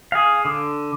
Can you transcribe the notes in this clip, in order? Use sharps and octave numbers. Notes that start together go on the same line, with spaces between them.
G#4 F5
D3